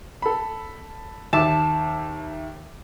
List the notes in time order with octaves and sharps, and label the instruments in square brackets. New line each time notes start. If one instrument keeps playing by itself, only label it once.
[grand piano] A4 B5
[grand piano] D#2 E5 D6 [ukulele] A5